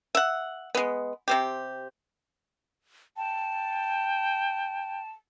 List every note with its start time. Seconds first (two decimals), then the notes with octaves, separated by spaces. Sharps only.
0.15 E5 F#5
0.75 G#3 B3
1.28 C3 C4 G4
3.17 G5 A5